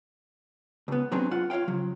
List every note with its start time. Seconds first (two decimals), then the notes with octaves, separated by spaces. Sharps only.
0.88 C#2 B3
1.12 C3 F#3 B3 C4 D4 G#4
1.31 F#2 F4 F#5
1.50 F4 C#5 E5 F5 G5
1.68 C#3 F3 F#3